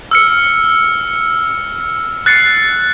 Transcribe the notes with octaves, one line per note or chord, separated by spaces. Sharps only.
E6 F6 C#7
F#6 A6 C7 C#7